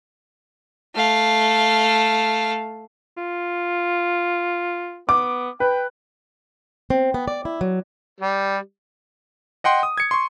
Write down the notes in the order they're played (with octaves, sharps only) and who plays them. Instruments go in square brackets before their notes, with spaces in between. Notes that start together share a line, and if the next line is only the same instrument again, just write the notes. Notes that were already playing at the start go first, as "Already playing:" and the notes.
[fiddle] A3 F5
[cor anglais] F4
[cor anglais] B3 [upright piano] D6
[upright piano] B4 [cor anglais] G5
[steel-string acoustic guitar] C4
B3
D5
E4
F#3
[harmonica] G3
[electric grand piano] D#5 F#5 G5 C6
D#6
G#6 C#7
C6 C#6